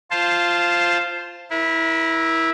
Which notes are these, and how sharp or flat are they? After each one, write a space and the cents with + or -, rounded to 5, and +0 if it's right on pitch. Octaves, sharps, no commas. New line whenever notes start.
F4 -10 C5 +0 A5 +0
E4 -10 A#4 +35